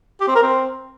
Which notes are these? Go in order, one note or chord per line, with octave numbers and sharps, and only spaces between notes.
G4
C4
A#4
C4